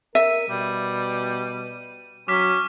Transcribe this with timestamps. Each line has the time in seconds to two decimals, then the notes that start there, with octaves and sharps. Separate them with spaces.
0.15 A#4 E5 D#7
0.49 B2 G3
2.28 F#3 C#4 D6 F6 B6